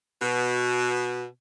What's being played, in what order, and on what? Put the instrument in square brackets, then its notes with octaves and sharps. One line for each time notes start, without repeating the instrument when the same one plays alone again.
[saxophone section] B2